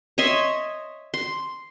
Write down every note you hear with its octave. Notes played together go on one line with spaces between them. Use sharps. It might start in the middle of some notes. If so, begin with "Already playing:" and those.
C#5 D#5 E5 C6
C6